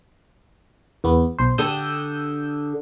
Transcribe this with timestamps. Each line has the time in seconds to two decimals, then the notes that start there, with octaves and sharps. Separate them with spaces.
1.04 E2 B3
1.39 B1 C5
1.58 D3 G4 A4 D#6 E6 G6